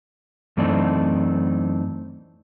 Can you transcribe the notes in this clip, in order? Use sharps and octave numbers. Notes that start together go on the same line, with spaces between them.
F#2 E3 A3 C4 D4 D#4